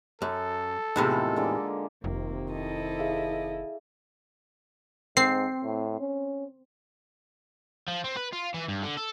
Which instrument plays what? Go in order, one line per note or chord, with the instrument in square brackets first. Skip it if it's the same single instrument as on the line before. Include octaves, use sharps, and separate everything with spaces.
[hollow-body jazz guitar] F#2 [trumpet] A4
[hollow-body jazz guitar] E2 A2 C3 [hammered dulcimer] D#3 G#3 F4
[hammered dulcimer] D3 G#3 A#3
[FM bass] F1 [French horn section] C3 D#3 [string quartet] A#3 [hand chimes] F4
[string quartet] E4 A4 D#5
[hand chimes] G#4 E5 F5
[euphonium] G#2 [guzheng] C4 [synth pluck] C7
[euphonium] A2
C#4
[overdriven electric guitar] F3
C4
B4
F4
E3
G2
D3
A4